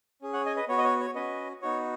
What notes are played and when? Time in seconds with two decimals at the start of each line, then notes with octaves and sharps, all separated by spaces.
0.22 C#4 G#4
0.33 C#5 F#5
0.46 D#5 G#5
0.56 B4 D#5
0.68 B3 F#4 C#5
0.78 D#5
0.84 C#5
1.00 C#5
1.15 C#4 F#4 B4 D#5
1.62 B3 D#4 F#4 C#5